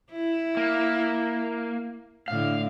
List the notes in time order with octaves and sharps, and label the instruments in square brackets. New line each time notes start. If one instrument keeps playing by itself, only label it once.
[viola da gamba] E4
[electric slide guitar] A#3
[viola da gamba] A2 D3 [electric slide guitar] F5